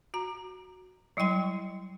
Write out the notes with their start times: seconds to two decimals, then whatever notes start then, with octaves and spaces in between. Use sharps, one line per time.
0.14 F#4 A#5
1.17 F#3 G3 E4 G5 C6